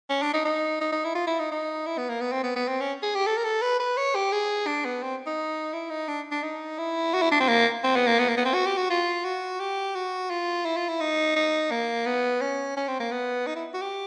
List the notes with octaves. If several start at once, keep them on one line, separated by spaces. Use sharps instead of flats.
C#4
D4
D#4
D#4
D#4
D#4
E4
F4
E4
D#4
D#4
E4
B3
A#3
B3
C4
B3
B3
C4
C#4
G#4
G4
A4
A#4
A4
B4
B4
C#5
G4
G#4
D4
B3
C4
D#4
E4
D#4
D4
D4
D#4
E4
F#4
E4
D4
C4
A#3
C4
B3
A#3
B3
A#3
B3
C4
F#4
G4
F#4
F4
F#4
G4
F#4
F4
E4
F4
E4
D#4
D#4
A#3
B3
C#4
C#4
C4
A#3
B3
D#4
E4
F#4
G4